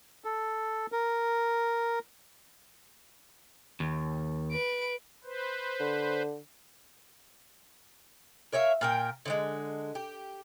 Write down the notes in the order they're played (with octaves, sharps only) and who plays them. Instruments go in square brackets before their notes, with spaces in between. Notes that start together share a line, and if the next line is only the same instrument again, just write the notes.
[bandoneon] A4
A#4
[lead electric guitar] D#2
[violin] B4 D7
[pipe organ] B4 C5
[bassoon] D3
[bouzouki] A#4 C#5 E5 F5
A#2 A#4 G5
D3 F3 G#3
G4